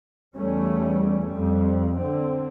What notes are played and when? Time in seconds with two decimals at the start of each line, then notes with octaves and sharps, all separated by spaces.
0.36 E2 G3 A3 C#4
1.29 F2 G3
1.97 D3 C4